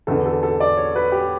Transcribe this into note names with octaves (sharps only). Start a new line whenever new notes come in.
E2 D3 A4
A4
A4
D5
C#5
B4
G4